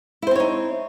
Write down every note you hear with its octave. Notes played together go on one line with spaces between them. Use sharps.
C4 D#4 E4 C5 C#5